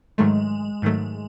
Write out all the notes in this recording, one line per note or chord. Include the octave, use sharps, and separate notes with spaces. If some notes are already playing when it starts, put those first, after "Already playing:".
G#2 D#3 F#3 G#3 A3
G#2 D#3 F#3 A3